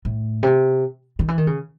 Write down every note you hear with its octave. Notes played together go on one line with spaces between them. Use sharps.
A2
C3
D#3
E3
D#3
C#3